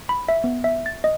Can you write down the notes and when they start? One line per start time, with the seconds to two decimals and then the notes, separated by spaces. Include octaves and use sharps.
0.09 B5
0.29 E5
0.44 B3
0.64 E5
0.86 A6
1.04 D#5